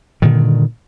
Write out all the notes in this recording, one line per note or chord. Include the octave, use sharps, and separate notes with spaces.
G2 A#2 D3 D#3